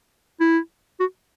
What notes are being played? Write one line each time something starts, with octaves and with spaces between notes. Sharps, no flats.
E4
F#4